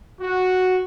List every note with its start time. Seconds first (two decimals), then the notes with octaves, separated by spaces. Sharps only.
0.21 F#4